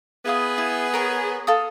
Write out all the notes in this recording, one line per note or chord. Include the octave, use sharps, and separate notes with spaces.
B3 E4 G#4 F5 D#6
E4
A#4 C#5 G#5
A4 F5 D#6